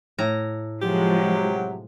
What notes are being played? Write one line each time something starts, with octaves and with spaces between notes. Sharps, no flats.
A2 A#5
C3 F3 F#3 G#3 G4